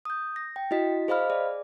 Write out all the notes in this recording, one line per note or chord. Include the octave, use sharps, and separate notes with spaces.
D#6 G6
A#6
G5
E4 F#4 D#5 B6
G#4 C5 D#5 F5 B5 F6
G#4 D5